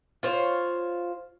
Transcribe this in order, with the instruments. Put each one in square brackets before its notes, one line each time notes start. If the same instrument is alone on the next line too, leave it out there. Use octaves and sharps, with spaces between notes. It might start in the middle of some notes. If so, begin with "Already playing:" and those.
[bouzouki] F4 C5 C#5